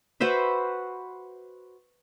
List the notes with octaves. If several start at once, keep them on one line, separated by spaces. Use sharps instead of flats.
F#4 B4 C5 E5